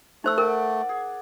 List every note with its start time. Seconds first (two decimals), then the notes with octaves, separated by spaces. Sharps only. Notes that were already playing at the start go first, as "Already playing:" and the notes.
0.24 A3 D#4 C5 E6
0.38 A#4 D5 F#5
0.89 G#4